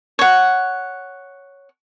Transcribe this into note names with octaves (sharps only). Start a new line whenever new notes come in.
C#5 F#5